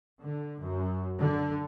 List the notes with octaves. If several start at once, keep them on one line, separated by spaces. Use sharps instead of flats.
D3
F#2
D3